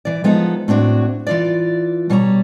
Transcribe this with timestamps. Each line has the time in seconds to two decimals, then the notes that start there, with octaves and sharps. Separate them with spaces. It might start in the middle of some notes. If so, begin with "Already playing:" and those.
0.05 E3 D5
0.24 F3 G#3 B3 D#4 A4
0.68 A2 C4 D4 F#4
1.27 E3 F4 D5
2.10 B2 G3 C#5 G#5 A#5